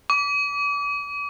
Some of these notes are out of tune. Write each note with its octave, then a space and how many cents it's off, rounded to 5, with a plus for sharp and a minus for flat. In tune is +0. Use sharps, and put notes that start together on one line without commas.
D6 -35